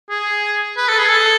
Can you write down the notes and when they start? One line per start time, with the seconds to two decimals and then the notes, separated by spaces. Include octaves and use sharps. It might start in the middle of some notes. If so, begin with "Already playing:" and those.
0.10 G#4
0.77 B4
0.88 A4
0.99 G#4
1.09 A4